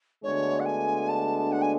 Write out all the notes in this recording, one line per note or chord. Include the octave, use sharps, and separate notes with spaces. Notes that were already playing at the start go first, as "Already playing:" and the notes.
D2 D3 G#3 B3 D4 C#5
F#5
G#5
A5
F#5
G#5